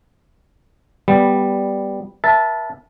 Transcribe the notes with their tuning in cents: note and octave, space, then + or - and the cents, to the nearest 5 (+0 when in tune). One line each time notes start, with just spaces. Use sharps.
G3 +0 B3 +0
A#4 +45 E5 +0 A5 -10